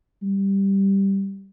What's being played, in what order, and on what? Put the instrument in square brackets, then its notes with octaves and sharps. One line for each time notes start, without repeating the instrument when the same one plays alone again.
[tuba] G3